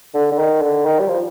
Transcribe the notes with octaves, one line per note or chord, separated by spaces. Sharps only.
D3
D3
D#3
D3
D#3
G3
F3